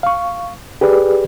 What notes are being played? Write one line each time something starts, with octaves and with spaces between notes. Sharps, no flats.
F5 C#6
G4 G#4 B4 D5